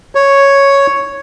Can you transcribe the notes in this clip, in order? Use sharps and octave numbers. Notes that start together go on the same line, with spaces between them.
C#5